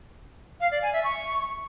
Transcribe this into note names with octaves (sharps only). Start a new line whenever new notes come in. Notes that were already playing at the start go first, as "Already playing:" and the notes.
F5
D5
G#5
E5
C#6